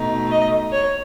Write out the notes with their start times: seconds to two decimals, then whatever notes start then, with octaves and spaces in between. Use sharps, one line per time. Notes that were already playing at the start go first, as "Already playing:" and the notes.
Already playing: B2 A3 D#4
0.30 D#5
0.72 C#5